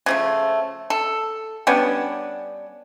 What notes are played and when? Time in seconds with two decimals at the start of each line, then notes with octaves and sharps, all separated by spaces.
0.06 C#3 F3 A3
0.90 A4
1.67 G3 B3 C#4 D4